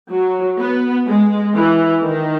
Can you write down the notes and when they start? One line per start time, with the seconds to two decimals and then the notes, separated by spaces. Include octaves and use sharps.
0.11 F#3
0.59 B3
1.08 G#3
1.55 E3
2.03 D#3